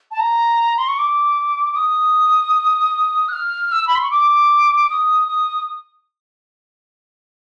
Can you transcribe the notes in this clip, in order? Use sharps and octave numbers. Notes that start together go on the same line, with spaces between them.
A5
A#5
C6
C#6
D6
D6
D#6
F#6
F6
E6
B5
C6
C#6
D6
D#6
D#6